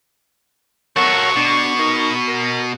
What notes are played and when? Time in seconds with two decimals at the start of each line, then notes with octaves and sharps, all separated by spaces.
0.97 F#3 A4 A#4 C#5 F#5 C#6
1.36 B2 D4
1.79 D#4 A#4
2.28 A#4